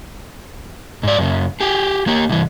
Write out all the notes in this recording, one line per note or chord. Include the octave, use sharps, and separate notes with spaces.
G#2 D5
F#2 C#3
G4 G#4
A#3 G4
C2 E3